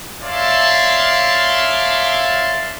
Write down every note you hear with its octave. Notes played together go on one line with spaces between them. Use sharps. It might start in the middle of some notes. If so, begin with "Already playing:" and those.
C#5 D5 E5 F5 A5 C6